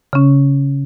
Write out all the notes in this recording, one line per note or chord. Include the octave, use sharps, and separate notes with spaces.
C#3 C#4